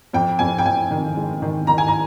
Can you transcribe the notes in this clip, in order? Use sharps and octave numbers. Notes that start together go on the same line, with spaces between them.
F2 G5
F2 G#5
G5
F2 G#5
D#3
G#3
D#3
D#3 A#5
G#5
A#5